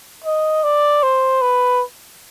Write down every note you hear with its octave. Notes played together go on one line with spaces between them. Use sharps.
D#5
D5
C5
B4